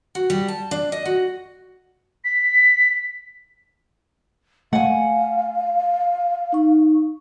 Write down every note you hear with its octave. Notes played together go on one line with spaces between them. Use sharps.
F#4
G3
A5
D4
D#5
F#4
B6
A3 F5 F#5 G#5
D#4 C#6